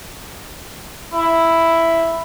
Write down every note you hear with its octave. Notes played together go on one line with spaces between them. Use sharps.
E4